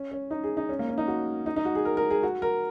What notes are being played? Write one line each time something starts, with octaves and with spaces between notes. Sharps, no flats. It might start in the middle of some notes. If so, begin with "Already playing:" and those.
Already playing: C#4
C#4
D#4
G#4
D#4
C#4
A#3
C#4
D#4
F#4
D#4
D#4
F#4
G#4
A#4
A#4
G#4
F#4
A#4